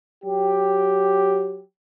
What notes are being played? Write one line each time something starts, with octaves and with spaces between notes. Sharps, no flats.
F#3 G4